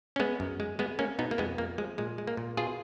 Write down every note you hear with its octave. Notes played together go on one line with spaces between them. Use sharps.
C#4
G#3 B3
F#2
G#3
G#3 B3
G#3 A#3 C#4
B2 B3 D#4
A#3
F2 G#3 B3
F2 A#3
F3 G#3
A#2 G#3
G#3
A#3
A#2
B2 F4 G#4